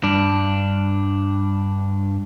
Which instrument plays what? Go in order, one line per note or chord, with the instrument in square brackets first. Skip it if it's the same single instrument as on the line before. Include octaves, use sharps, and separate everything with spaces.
[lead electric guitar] G2 D4